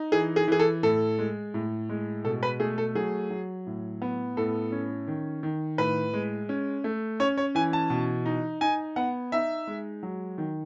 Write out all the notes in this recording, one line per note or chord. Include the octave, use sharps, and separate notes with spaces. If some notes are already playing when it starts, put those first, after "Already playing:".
Already playing: D#4
E3 G#4
G#4
E3 G#4
A4
A2 A4
G#3
A2
G#3
B2 A4
B4
A3 G#4
A4
F#3 G#4
F#3
A2
B3
A2 A4
C#4
D#3
D#3
A2 B4
G#3
C#4
A3
C#4 C#5
C#5
E3 G#5
A5
B2
D#4
D#4 G#5
B3 F#5
D#4 E5
G#3
F#3
D#3